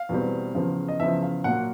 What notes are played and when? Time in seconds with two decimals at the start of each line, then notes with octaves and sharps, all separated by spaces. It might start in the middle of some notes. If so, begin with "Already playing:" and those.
Already playing: F5
0.09 E2 B2 G3 C4
0.55 E2 C#3 F3
0.88 D#5
0.99 E2 C#3 F3 E5
1.22 F5
1.44 A#2 F#3 A#3 F#5